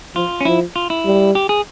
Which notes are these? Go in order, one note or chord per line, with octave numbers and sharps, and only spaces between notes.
F3 F4
C#4
F3 E4
F4
E4
G3
G4
G#4